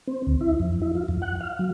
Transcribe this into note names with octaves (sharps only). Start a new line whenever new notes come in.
C4
D2
E4
F2
E4
F4
F2
F#5
F5
F#3